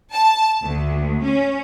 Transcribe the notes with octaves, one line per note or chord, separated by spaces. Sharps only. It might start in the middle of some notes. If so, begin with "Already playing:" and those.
A5
D2
C#4